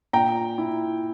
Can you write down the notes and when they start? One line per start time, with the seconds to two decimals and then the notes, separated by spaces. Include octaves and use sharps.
0.13 A#2 G5 A#5
0.58 E4